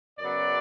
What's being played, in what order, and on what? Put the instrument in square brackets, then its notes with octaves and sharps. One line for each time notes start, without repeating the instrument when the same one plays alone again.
[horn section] F#2 C#3 F#3 B3 D5